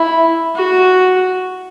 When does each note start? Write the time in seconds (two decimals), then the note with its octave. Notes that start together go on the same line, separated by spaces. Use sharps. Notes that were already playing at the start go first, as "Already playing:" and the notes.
Already playing: E4
0.55 F#4